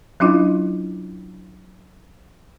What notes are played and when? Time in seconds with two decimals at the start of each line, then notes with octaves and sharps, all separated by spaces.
0.20 F#3 C#4 D4 E4 F4 D#5